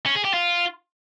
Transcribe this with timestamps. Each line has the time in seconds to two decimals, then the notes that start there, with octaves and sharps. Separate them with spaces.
0.06 C#4
0.15 G#4
0.25 G4
0.34 F4